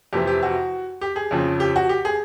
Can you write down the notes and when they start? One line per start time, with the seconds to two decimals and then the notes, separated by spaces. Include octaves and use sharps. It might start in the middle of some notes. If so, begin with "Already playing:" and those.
0.13 F2 C3 E3 G4
0.27 G4
0.43 F#4
1.01 G4
1.16 G#4
1.31 F2 C#3 F3
1.60 G4
1.76 F#4
1.89 G4
2.05 G#4